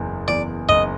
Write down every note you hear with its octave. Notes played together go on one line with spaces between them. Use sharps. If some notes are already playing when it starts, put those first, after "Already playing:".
Already playing: F#1 E2
E2 D5
F#1 D#5